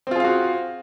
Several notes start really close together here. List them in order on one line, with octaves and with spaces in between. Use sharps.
C4 F4 G#4 F5 F#4